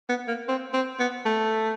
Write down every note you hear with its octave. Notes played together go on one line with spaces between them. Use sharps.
B3
A#3
C4
C4
B3
A3